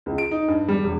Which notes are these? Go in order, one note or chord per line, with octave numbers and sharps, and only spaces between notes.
C#2
D7
D#4
G2
G3
E1